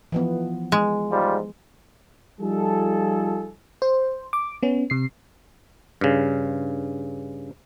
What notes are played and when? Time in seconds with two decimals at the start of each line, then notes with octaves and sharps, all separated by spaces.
0.12 E3 F3 B3
0.72 G#3
1.10 G#2 G3 F4
2.41 F3 G3 D#4 F4 G#4 A4
3.82 C5
4.33 D6
4.63 B3 C#4
4.90 C3 C7
6.01 G2 C#3